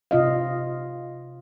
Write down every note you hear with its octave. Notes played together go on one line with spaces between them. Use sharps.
C3 F4 D#5 F5